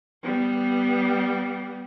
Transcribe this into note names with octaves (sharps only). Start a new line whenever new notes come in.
G3 B3